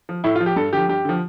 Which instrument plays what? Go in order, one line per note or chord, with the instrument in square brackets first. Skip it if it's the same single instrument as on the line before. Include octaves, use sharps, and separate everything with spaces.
[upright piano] F3
A2 E4
F4
F3
G4
G2 A4
D3 F3 G4
G2 G4
D3 F3